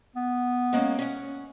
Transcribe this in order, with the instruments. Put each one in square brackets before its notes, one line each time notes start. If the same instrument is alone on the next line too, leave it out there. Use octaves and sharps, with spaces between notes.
[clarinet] B3
[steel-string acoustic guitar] G#3 A#3 C#4
C#4 F#5